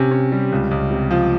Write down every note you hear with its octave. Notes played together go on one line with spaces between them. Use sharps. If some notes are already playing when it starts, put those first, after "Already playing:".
Already playing: C3 C#4
C#4
G3
C#2
C#2
C3
F3